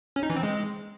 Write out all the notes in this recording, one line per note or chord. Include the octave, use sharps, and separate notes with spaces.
C#4
D#4
E3
C4
G#3